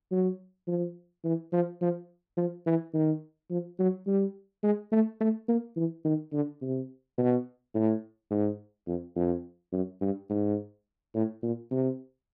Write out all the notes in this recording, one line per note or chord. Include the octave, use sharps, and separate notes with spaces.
F#3
F3
E3
F3
F3
F3
E3
D#3
F3
F#3
G3
G#3
A3
A3
A#3
E3
D#3
D3
C3
B2
A2
G#2
F2
F2
F#2
G2
G#2
A2
A#2
C3